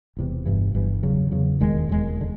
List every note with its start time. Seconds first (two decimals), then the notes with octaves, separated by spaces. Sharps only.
0.16 E1 E2 C3
0.46 G1 G2 E3
0.75 G1 G2 E3
1.03 E2 C#3 F#3
1.31 E2 C#3 F#3
1.60 E1 D#2 D#3 G#3
1.89 E1 D#2 D#3 G#3
2.21 D3